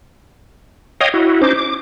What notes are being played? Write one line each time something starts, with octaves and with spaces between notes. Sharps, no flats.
C#5 D#5 F5 G5 D#6
E4 F#4
C#4 D#4 C5 D6
D6